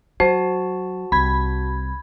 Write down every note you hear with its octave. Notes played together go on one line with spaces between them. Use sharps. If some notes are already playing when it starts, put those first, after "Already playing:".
F#3 F#4 C5 A5
C2 B5 G#6